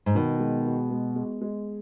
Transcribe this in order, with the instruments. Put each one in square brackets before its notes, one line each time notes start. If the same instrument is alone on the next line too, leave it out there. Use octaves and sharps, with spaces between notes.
[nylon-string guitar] G#2
[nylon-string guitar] B2 [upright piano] D#3
[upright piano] G#3
F#4
G#3
G#3
G#3